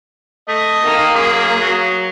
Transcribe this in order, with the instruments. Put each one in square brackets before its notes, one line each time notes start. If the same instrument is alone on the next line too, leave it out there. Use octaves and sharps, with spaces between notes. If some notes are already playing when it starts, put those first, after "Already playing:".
[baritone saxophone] A3 [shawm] D#5
[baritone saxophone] D#3 [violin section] A#3
[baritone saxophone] F#2 [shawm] G#4
[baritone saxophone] F#3